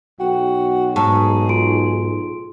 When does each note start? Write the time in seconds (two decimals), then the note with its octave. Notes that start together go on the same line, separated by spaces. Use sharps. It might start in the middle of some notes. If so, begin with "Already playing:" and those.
0.20 B1 F#4 G5
0.96 G#2 G#4 A5 C#6
1.49 F4 C6 D7